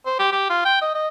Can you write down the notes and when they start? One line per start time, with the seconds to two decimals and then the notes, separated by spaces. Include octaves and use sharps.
0.06 C5
0.19 G4
0.32 G4
0.50 F4
0.65 G5
0.81 D#5
0.95 D#5